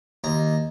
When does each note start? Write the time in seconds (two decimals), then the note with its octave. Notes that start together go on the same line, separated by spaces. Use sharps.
0.24 D#2 A#5